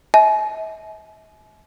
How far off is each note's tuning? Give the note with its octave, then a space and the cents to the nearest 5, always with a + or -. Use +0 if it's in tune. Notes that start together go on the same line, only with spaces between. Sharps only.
E5 -45 G#5 +45